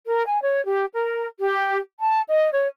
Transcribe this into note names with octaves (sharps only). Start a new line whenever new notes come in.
A#4
G#5
C#5
G4
A#4
G4
A5
D#5
C#5